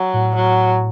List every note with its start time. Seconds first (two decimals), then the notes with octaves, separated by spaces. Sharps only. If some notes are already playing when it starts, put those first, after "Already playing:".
Already playing: F#3
0.14 A2
0.36 F#3